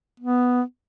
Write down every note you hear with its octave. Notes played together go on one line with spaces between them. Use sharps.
B3